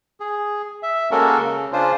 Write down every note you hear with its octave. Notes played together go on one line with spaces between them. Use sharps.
G#4
E5
G#3 A#3 C#4 F#4 A4 A#4
C#3
C#3 C#4 D4 F4 C5